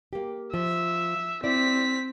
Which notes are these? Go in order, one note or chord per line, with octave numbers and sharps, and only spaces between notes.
A#3 G4
F3 E5
C4 E4 D5 B6